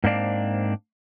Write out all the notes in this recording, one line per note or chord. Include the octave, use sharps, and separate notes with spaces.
G#2 A#3 C4 D4 D5 F5